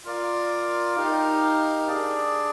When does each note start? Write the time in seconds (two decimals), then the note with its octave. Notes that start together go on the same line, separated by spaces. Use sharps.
0.05 F4 A#4 D5 F5
0.97 D#4 G4 A#4 F5
1.88 D4 G#4 D5